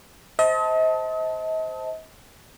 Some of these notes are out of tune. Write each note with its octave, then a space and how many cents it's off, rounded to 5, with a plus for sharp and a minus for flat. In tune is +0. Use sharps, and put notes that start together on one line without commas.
C5 +0 D#5 +40 A5 +0